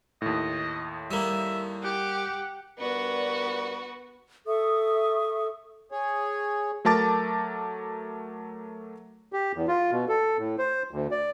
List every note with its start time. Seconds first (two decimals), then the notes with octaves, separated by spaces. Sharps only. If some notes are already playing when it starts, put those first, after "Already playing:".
0.22 D#2 A2 D#5
1.11 G3 A#3 E5
1.83 G4 F#5
2.79 G2 B3 F#4 A#4 D5
4.46 A4 E5 C#6 D#6
5.92 G#4 C#5
6.85 F#3 A3 A#4 A5 D6 A6
9.33 G4
9.55 E2
9.68 F4
9.92 B2
10.09 A4
10.38 A2
10.58 C5
10.91 D2
11.11 D5